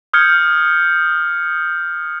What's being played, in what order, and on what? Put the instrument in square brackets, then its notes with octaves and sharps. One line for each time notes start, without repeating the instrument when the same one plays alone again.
[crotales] D#6 F6 G6 G#6 C#7